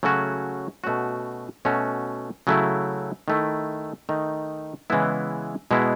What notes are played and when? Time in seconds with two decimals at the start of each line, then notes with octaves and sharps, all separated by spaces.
0.03 C#3 F#3 A3 C#4 F#4
0.84 B2 A3 C#4 F#4
1.65 B2 A3 C#4 F#4
2.47 C#3 F#3 A3 E4
3.28 D#3 A3 E4
4.09 D#3 A3 D#4
4.90 C#3 E3 G#3 B3 E4
5.71 B2 G#3 B3 E4